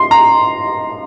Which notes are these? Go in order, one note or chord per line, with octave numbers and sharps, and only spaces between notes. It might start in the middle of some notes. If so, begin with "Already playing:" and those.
Already playing: C6
A#5